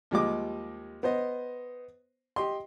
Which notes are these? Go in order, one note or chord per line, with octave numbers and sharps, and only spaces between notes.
D#2 F3 G3 G#3 D#5 D6
B3 C5 D#5
G4 D#5 C6